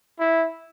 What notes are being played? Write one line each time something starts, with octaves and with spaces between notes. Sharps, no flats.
E4